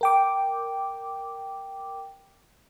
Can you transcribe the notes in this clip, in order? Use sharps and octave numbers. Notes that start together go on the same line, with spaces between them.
A#4 G5 D6